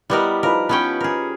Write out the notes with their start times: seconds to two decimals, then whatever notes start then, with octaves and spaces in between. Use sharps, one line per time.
0.10 G3 B3 E4 G4 A#4 D#5
0.43 F3 D#4 A#4 B4
0.69 B3 C#4 G5 B5 C#6
1.00 G#4 A#4